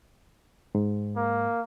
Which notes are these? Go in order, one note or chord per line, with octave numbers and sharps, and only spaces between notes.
G#2
A#3